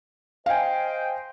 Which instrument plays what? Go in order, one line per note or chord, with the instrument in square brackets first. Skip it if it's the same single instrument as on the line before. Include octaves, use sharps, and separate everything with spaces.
[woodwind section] C5 D#5 G5 [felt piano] F5 G#5